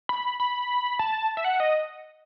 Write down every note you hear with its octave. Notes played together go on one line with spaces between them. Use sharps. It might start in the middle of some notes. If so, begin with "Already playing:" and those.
B5
B5
A5
E5
F#5
D#5